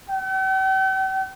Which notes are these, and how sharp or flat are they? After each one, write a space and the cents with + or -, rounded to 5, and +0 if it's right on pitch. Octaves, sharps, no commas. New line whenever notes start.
G5 -45